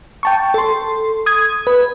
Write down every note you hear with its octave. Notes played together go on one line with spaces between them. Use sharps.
G5 A5 C#6
A4 C6
D#6 G#6
B4